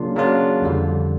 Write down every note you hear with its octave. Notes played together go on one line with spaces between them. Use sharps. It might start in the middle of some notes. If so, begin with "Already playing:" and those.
Already playing: C#3 F#3 A#3 D4 F4
C#3 F#3 A#3 D4 F4
F2 D3 G3